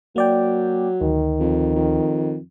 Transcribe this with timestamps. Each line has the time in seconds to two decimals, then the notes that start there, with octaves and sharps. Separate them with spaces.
0.16 F#3 A#3 D5 G5
1.01 D2 D#3
1.40 F2
1.75 F2